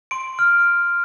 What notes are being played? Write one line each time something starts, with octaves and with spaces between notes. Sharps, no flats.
C6 D7
F6